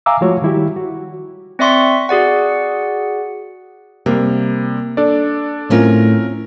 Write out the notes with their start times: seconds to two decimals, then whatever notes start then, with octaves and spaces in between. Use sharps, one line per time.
0.06 E5 F5 G#5 A#5 D6 E6
0.21 F3 G#3 A3 F4 F#4 C#5
0.42 D#3 G3 E4 F#4 G4
0.76 F#4
1.59 C4 D5 E5 C6 C#6 B6
2.09 F#4 G#4 D5 F#5
4.06 C3 G3 A#3
4.97 D4 A4 D5
5.70 A2 A3 C4 C#4 F4 A#4